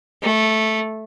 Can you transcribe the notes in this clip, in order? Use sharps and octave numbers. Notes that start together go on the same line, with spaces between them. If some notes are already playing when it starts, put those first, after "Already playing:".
A3